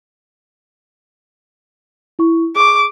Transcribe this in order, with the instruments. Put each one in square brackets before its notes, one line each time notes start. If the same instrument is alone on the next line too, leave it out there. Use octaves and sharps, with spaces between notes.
[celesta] E4 C#6
[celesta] G#4 C#6 [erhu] D6